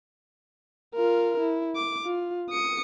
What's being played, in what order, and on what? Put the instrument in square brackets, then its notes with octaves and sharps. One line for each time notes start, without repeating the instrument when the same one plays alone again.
[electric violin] F4 A#4
E4
D6
F4
D#6 C#7